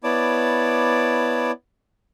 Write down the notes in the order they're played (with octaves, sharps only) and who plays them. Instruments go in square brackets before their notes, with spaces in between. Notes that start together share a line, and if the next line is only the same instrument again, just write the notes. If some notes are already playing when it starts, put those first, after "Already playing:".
[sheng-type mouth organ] B3 E4 C#5 D5 A5 D6